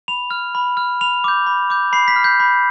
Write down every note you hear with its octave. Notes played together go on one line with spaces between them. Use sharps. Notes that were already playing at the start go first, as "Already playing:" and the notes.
B5 F7
F6
B5
F6
B5 F7
D6 G6
B5
D6 G6
B5 C7
B6
F6
G6
B5